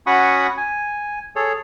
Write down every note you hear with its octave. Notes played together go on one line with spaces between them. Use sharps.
C#4 F#4 F#5 B5 C#6 D#6
G#5
G#4 A4 C#5